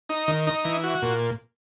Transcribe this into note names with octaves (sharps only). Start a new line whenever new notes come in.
D#4
D#3
D#4
E3
F#4
A#2